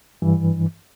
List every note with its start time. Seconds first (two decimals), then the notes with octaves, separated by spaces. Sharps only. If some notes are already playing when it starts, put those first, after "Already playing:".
0.22 G2 E3